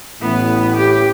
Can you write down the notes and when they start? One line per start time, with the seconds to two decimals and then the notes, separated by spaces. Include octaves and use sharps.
0.21 A1 A2 B3
0.76 G4